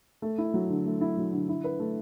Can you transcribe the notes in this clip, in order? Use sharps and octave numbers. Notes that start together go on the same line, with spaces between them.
A3
E4
F#3
D3
A3
E4
F#3
D3
E4
B4
A3